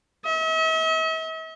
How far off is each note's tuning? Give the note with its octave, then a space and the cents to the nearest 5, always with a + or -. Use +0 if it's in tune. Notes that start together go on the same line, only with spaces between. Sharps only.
E5 -45